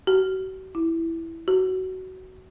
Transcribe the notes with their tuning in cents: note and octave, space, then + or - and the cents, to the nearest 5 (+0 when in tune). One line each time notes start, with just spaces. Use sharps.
F#4 +40
E4 +0
F#4 +15